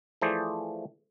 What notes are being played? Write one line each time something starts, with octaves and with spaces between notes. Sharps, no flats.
E3 F3 A3 G#4 C5 D5